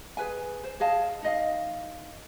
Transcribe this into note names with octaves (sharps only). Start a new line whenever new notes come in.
G#4 B4 G#5
C5
G#4 D#5 F5 A5
D#4 D#5 F5